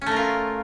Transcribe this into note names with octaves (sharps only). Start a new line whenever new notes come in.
A3 C#4 F4 A#4